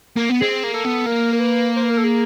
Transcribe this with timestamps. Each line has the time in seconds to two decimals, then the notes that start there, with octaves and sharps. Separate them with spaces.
0.16 A#3
0.29 B3
0.41 C4 G#4
0.63 A#3
0.74 A4
0.85 B3
1.06 A#3 A#4
1.33 A#4
1.40 B4
1.76 C5
1.84 B4
1.90 A#4
1.98 A4
2.04 G#4